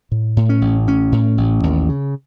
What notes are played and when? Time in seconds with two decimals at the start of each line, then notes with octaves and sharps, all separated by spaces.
0.12 A2
0.37 A2
0.49 C#4
0.61 A1
0.87 A2 C#4
1.12 A2
1.38 A1
1.63 D#2
1.89 C#3